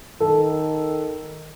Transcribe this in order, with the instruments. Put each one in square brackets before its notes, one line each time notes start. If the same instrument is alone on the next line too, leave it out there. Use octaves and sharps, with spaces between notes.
[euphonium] D#3 [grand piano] A4